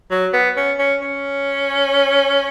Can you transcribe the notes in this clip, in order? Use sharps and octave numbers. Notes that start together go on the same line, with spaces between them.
F#3
B3
C#4
C#4
C#4